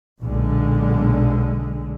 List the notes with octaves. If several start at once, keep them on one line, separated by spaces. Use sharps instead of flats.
B1 A#2 D3 G#3